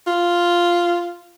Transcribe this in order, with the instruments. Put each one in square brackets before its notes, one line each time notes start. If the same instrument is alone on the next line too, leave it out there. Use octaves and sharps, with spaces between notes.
[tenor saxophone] F4